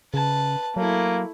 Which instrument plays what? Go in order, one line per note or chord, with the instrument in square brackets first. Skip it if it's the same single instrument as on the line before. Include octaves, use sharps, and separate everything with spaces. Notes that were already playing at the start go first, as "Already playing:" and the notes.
[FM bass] C#3 [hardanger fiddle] B4 A5
[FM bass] F#3 [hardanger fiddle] A3 E4 [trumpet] A#3